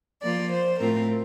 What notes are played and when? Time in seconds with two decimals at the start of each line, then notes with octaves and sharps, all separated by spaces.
0.22 F3 A#3 F4 D5
0.51 C5
0.80 A2 A3 C4 F4 A#4